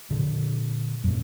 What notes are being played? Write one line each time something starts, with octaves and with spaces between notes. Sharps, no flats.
A#2 D3
F#2 A#2